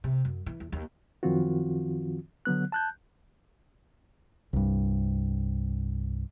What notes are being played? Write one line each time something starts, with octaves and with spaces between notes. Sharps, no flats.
C3
F#2
E3
E2
D#2
F#2 D#3 F3 C4 F4 F#4
D3 F#3 B3 F#6
A5 F#6 G6
C2 G2